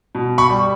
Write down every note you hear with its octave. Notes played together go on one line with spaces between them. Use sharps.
B2
B5 C#6
G3